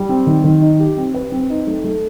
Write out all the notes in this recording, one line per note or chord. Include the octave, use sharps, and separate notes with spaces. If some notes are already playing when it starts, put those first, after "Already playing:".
Already playing: G3
C4
D#3
D#3
D#4
G4
C4
B4
C4
D#4
A3
A3